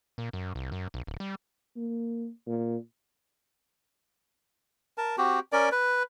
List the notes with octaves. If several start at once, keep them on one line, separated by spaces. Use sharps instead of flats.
A#2
F#2
C2
F#2
B1
D1
G3
A#3
A#2
A#4 A5
C4 F#4 G4
C#4 A#4 D5
B4